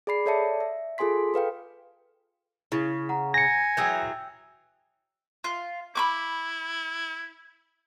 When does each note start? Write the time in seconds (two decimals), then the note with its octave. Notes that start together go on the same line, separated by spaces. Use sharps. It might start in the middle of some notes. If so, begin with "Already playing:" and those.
0.07 G#4 D5 B5 C7
0.26 A4 C#5 D5 E5 A5 C#7
0.60 E5
0.98 F4 G#4 A4 G#5 C6 B6
1.34 A4 B4 F5 G5
2.72 C#3 E4
3.09 F#5 A#5
3.34 G#5 A#6 C#7
3.77 E3 F#3 G#4 G5 E6 G6
5.44 F4
5.95 E4 B5 C#6 D6